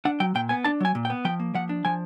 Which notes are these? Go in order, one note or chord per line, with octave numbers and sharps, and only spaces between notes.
D4 F#5
F#3 G5
A#2 G5
B3 G#5
D4 A5
F#3 G#5
A#2
G5
B3
F3 G5
A#3
F3 F#5
D4
F3 G#5